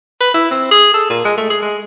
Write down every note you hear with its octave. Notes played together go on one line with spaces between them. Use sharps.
B4
E4
C4
G#4
A4
A#2
G#3
A3
G#4
G#3